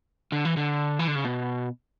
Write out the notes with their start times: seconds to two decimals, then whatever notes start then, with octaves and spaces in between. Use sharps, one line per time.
0.32 D3
0.45 E3
0.57 D3
0.99 E3
1.07 D3
1.15 C#3
1.24 B2